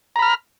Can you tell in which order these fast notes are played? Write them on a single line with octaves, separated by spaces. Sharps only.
A#5 B5 F6